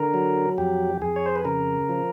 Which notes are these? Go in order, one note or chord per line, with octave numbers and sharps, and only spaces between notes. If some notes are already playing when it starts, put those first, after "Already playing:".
Already playing: D3 A#4
F#3
F2 G4
F2 G#4
C#5
C5
B4
C#3 A#4
F3